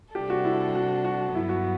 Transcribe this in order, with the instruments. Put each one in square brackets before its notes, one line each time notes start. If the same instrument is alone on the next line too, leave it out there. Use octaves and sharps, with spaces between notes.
[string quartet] C3 G3 D4 A4 [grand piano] G4
[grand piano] F#4
E4
F#4
F#4
[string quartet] G2 F#3 B3 [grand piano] E4
[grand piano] F#4